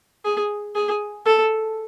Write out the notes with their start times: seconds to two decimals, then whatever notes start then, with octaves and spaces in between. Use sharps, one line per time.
0.24 G#4
0.75 G#4
1.25 A4